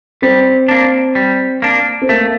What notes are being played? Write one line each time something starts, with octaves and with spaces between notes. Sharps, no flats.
G3 C4
A#3 D4
G3
A#3 D4
C4
A3 A#3